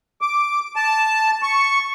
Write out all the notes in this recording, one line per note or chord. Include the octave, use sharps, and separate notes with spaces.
D6
A5
C#6